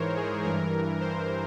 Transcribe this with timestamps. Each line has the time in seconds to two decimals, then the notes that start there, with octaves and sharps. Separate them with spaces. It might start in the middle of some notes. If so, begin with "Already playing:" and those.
Already playing: G#2 E3 A#4 C5 C#5
0.16 G#4
0.43 G2 E3 A#4
1.00 C5